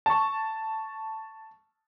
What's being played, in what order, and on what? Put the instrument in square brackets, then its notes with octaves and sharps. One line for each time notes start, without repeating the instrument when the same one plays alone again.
[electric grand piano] A5 C#6